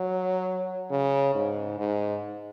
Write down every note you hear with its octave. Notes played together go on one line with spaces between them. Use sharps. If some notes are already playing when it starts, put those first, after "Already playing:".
Already playing: F#3
C#3
G#2
G#2